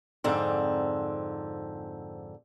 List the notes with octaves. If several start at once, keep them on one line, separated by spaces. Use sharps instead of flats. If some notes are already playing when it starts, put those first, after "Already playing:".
F2 G#2 D3 C4